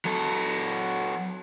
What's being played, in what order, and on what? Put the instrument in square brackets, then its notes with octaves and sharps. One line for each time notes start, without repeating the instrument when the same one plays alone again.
[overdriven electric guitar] F#3 A4